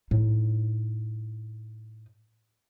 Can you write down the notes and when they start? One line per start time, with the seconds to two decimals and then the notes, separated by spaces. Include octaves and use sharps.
0.11 A2 D#4